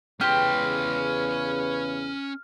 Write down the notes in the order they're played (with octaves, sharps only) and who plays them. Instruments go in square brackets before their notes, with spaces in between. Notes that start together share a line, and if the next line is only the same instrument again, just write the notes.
[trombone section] E2 C#3 B4 [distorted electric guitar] C#4 C6 [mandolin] G4 [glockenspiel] F6